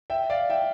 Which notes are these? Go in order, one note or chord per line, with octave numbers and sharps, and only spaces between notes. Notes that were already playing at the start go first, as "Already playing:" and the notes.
E5 G5
D5 F5
E5 G5